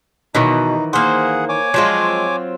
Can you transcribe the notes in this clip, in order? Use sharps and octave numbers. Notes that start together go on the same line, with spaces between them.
B2 D#3 E3 F#3 D#4
A#3 G#4 C5 F#5
C#5 G#5 D6
F3 F#3 G#3 C4 F4